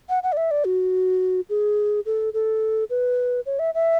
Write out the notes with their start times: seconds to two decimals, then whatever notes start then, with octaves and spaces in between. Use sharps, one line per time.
0.09 F#5
0.23 F#5
0.32 D5
0.37 E5
0.51 D5
0.65 F#4
1.50 G#4
2.06 A4
2.34 A4
2.90 B4
3.46 C#5
3.59 E5
3.74 E5